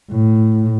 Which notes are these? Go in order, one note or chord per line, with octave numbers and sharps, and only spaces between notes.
A2